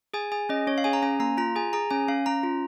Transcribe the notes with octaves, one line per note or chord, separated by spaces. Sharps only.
G#4 G#5
G#4 G#5
C#4 D#5
C#4 C#5
F5
G#4 G#5
A#5
C#4 G#5
A#3 A#5
F4 A#5
G#4 G#5
G#4 A#5
C#4 G#5
C#4 F5
C#4 A#5
F4